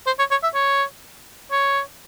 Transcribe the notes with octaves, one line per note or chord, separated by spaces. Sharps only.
C5
C#5
C#5
E5
C#5
C#5